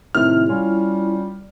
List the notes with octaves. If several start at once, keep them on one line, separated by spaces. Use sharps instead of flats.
A2 C3 D#3 E4 F6
G3 C#4 F4